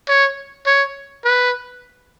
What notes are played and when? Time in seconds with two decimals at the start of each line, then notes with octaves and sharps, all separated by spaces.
0.08 C#5
0.66 C#5
1.25 B4